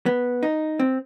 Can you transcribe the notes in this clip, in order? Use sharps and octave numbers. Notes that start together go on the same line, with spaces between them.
B3
D#4
C4